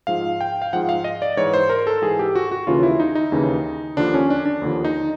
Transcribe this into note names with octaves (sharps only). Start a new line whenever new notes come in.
G#2 F3 F5
G5
F5
G#2 F3 F#5
F5
D#5
D5
G#2 E3 C#5
C5
A#4
A4
G#2 E3 G#4
G4
F#4
F#4
D#2 C#3 E3 F4
E4
D#4
D#4
D#2 C#3 E3
D#2 D3 F3 D4
C#4
D4
D4
D#2 D3 F3
D#4